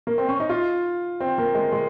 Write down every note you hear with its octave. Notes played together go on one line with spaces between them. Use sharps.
A#3
C4
C#4
D#4
F4
C4
A#3
G#3
G#3